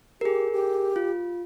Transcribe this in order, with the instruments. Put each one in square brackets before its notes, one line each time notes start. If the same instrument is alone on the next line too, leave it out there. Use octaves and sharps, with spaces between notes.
[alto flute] G4 [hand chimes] G#4 A#4
[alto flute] G4
[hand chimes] F4